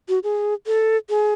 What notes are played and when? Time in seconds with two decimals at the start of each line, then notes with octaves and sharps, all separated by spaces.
0.09 F#4
0.23 G#4
0.67 A4
1.09 G#4